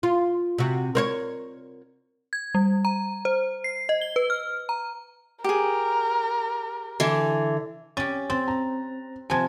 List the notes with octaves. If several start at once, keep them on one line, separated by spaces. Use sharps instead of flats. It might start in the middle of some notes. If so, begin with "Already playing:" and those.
F4
C3 F#4
A#4 C5 C#5
G#6
G3
A#5
C5
C7
D#5
G7
B4
F6
A#5
G4 G#4 A#4
D3 E3
C#4 G4 A6
C4 A6
A#5
C3 F3 G#5 A5 G#6